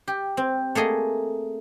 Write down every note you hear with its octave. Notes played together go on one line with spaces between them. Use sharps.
G4
C4
A3 A#3 G#4 D#5